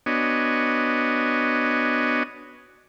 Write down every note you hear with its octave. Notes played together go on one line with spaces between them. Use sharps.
B3 D4 F#4 C#5 D#5 G#5